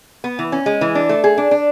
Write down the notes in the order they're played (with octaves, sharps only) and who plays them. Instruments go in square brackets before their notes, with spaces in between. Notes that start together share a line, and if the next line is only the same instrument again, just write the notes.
[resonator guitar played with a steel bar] B3
E3
C#4
G#3
E3
D4
A3
G#4
D4
D4